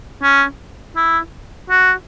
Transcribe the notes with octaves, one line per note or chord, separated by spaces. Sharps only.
C#4
E4
F#4